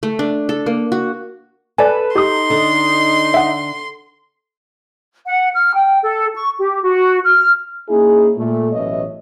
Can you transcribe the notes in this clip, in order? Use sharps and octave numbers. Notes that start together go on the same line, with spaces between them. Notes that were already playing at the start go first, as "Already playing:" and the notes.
A3
D4
A4
A#3
F#4
A4 B4 D5 G#5
D#4 G4 C6 D#6
D3
E5 F#5
F#5
F6
G5
A4
C#6
G4
F#4
F6
A#3 C#4 D#4 E4 G#4
A#2 A3
A1 F#2 B2 C#5 D#5 E5